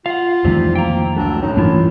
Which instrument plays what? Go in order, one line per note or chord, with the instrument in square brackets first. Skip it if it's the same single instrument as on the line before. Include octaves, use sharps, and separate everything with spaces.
[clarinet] F4 [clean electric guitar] F5 F#5
[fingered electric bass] F2 D#3 E3 [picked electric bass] C3 [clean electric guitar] G3 A3 D#4
[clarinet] A#3 [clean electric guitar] G5 A#5
[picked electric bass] C#2 F#3 A3 [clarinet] D4
[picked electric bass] A2 C#4 [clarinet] D#4
[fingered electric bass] G2 E3 [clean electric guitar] A3 E4 A#4 [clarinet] F4